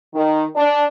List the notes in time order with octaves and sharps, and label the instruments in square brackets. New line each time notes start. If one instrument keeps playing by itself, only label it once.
[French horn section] D#3
D4